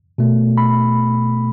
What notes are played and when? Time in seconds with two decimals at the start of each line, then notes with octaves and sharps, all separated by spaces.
0.18 B2 A3
0.58 B5